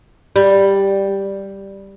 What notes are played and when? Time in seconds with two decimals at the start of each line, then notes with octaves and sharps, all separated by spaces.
0.36 G3